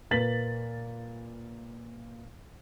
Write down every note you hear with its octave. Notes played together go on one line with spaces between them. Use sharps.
A#2 A#3 B4 A6 B6 F#7